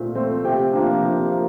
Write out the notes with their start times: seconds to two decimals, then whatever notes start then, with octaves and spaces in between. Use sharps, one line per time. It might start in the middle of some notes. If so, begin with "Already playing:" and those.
Already playing: A#2 A3 C4
0.15 A3 C4
0.44 C3 G5
0.73 F3 A#3 D4
1.03 C3
1.32 F3 A#3